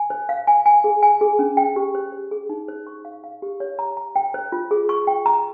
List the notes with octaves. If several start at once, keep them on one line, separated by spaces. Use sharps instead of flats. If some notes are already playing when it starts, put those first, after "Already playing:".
Already playing: G#5
C5
F5
G#5
G#5
G#4
G#5
G#4
C#4
G5
G4
C5
C5
G#4
D#4
C5
C#6
F5
F5
G4
C#5
A#5
A#5
G5
C5
F4
G#4
C#6
G5
A#5